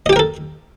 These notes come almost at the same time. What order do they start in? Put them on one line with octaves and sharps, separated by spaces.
D#5 G4 G5 A#4 A4